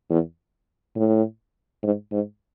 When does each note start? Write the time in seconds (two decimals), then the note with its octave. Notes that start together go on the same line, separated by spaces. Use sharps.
0.10 E2
0.96 A2
1.83 G#2
2.12 G#2